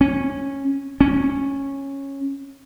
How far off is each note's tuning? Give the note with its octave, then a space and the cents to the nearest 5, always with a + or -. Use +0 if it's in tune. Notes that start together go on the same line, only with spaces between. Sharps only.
C#4 -15
C#4 -10